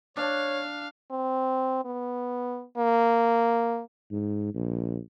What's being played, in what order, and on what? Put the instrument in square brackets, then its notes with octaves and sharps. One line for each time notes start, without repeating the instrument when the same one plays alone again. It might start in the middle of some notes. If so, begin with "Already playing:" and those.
[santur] D4 [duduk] C#5 [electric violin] F5
[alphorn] C4
B3
A#3
[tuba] G#2
A#1